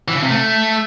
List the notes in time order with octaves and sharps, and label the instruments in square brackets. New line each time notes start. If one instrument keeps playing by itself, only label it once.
[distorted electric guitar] E3
C#3
C3
A3